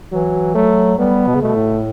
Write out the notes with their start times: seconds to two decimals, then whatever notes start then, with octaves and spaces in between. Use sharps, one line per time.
0.12 E3 F#3
0.55 F#3 A3
0.98 G3 B3
1.27 B2
1.35 C#3
1.42 B2 A3
1.55 A2